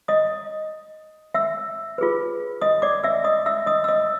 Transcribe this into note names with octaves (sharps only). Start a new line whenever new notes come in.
D#5 D#6
E5 E6
F4 G#4 B4
D#5 D#6
D5 D6
E5 E6
D#5 D#6
E5 E6
D#5 D#6
E6
D#5 D#6